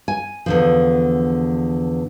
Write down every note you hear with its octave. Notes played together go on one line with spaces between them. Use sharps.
G#5
E2 D3 F3